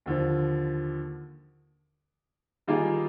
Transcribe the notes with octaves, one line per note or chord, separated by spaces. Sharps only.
D#2 D3 F3
D#3 G3 A#3 F4 G#4